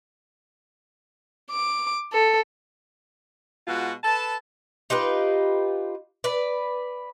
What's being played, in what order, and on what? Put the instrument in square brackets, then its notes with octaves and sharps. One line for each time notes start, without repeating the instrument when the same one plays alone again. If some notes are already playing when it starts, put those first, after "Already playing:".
[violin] D6
A4
[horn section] B2 G#3 F4 F#4
A4 B4 A5
[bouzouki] D#4 F4 G4 B4
B4 D5